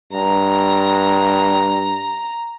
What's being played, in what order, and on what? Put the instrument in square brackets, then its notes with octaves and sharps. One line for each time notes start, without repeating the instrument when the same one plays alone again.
[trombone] G2 [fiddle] A#5